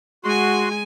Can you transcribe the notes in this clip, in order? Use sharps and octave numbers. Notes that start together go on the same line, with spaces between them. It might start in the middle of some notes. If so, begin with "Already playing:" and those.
G#3 F#4 G#5 C6